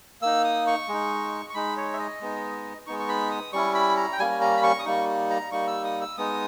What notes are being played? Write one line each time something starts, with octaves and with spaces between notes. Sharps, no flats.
A#3 D#4 E6
D#6
C#6
G#3
D#4
C#6
G#3 D#4 B5
C#5
E5
D#5
G#3 B3 D#4
G#3 B3 D#4 C#6
C#6
B5
D#6
G3 C#4 E4 C#6
B5
A#5
G5
G3 A#3 C#4 G#5
A#5
B5
C#6
D#6
G3 A#3 D#4 C#6
A#5
G3 A#3 D#4 C#6
E6
D#6
E6
G#3 B3 D#4 D#6